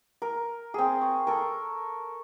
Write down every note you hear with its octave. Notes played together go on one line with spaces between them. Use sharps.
A#4
C4 G#4
C#6
A4 A#4